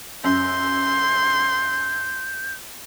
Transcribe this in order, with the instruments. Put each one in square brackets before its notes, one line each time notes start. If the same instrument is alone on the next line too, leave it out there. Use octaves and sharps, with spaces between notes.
[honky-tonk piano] F#2 [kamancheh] C6 [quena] G6